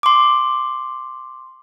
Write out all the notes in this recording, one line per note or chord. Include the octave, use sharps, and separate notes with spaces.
C6 D6